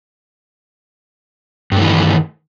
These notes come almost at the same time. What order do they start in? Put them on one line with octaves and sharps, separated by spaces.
G2 A3 E3 D#3